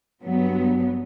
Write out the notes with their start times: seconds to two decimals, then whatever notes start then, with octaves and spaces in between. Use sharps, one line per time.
0.21 G2 F#3 B3